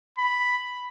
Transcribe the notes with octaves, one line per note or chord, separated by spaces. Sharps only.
B5